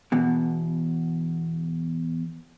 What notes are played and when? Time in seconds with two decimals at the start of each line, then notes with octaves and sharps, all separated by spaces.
0.12 E2 B2